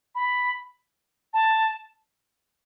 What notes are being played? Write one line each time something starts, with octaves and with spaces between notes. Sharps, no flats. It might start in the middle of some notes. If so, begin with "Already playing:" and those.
B5
A5